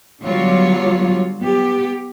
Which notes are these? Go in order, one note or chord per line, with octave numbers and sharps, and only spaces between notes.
D3 F#3 G3 B3 F4 C#5
B3 G4